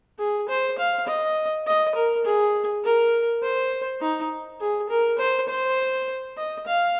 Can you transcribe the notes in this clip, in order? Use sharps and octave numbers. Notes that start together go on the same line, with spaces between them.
G#4
C5
F5
D#5
D#5
A#4
G#4
A#4
C5
D#4
G#4
A#4
C5
C5
D#5
F5